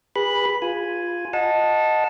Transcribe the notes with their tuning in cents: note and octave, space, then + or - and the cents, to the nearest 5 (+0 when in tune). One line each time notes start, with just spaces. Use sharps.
G#4 -35 B4 -20 B5 +0
F4 +0 G#5 +0
D#5 +0 F#5 -35 A5 +0